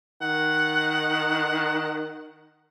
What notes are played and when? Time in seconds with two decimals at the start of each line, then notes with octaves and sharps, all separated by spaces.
0.21 D#3 F#5